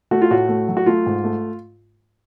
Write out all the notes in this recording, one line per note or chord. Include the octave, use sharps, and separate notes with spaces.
A3 F#4
F4
A2 F#4
A3
F#3
F#4
A3 F4
G#2
A3